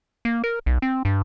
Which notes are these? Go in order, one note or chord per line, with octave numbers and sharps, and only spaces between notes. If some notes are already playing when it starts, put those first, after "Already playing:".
A#3
A#4
B1
C4
G2